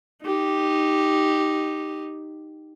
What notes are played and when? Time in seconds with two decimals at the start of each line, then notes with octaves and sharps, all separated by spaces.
0.23 D#4 G4